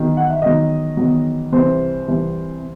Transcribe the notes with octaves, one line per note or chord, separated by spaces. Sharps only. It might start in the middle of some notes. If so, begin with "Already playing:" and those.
Already playing: E2 D#3 F#3
F#5
E5
E2 D#3 F#3 D#5
E2 D#3 F#3
C2 C3 E3 C5
C2 C3 E3